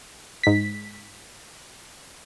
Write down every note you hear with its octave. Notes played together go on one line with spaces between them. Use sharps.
G#2 B6